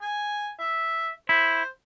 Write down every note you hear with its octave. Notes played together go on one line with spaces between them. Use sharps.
G#5
E5
E4 C5